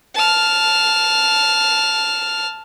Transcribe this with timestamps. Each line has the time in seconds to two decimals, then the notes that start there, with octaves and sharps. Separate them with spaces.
0.15 A5 F6